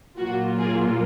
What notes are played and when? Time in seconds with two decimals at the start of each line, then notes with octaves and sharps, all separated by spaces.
0.17 A#2 F#3 A#3 F4 F#4
0.58 G#4